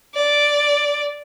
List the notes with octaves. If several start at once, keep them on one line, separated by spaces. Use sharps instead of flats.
D5